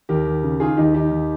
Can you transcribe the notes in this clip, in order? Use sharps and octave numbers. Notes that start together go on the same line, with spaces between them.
D#2 G4 A#4
D#2
C#3
D#3 F4 G#4
D#2 D#4 G4
D#3 D#4 G4
D#2